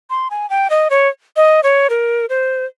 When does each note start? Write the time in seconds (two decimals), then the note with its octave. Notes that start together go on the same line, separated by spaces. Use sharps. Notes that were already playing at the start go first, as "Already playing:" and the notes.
0.10 C6
0.31 G#5
0.50 G5
0.70 D#5
0.90 C#5
1.36 D#5
1.63 C#5
1.90 A#4
2.29 C5